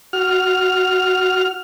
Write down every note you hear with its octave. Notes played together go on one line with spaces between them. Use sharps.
F#4 F6